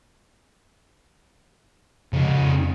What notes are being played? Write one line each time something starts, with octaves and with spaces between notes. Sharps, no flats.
F2 C#3 D#4